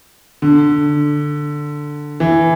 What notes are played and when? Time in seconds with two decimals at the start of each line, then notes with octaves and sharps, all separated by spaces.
0.42 D3
2.20 E3